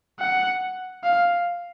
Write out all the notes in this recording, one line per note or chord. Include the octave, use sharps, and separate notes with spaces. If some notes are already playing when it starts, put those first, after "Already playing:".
F#5
F5